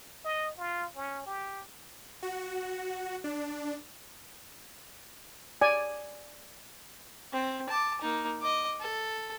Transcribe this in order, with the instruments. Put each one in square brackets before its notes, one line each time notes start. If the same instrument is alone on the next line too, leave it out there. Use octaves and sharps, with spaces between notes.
[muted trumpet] D#5
F4
C#4
G4
[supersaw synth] F#4
D4
[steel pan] D5 G#5
[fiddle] C4
A5 D6
A#3 D#4
D#5 D6
A4